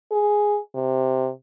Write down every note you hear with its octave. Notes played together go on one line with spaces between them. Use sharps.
G#4
C3